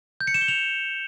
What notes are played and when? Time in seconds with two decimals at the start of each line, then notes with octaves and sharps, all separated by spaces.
0.21 G6
0.27 C#7
0.34 E7
0.41 G7
0.48 F7